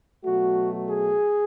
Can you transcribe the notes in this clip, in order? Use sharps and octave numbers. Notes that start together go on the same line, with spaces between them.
B2 F#3 A3 F#4
G#4